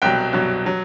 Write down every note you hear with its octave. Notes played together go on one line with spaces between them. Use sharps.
C2 B2 F#3 G5
C2 B2 F#3
F#3